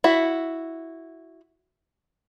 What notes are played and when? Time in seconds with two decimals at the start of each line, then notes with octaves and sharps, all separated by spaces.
0.04 E4 F#4